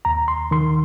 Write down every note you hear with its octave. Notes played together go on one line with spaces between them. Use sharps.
D#2 A#5
C6
D#3 C6